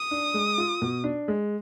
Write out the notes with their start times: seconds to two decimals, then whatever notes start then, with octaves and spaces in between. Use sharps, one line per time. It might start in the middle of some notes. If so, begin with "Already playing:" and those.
Already playing: D#6
0.11 D4
0.34 G#3
0.58 F4
0.82 B2
1.04 D4
1.28 G#3